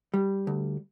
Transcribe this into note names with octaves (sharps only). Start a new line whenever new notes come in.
G3
D2